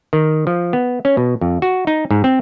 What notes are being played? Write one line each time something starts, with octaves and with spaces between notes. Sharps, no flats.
D#3
F3
B3
C#4
B2
F2
F#4
D#4
G#2
C4